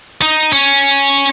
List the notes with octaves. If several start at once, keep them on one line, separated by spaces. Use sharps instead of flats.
D#4
C#4